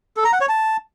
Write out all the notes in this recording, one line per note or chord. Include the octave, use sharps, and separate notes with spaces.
A4
A#5
F#5
C#5
A5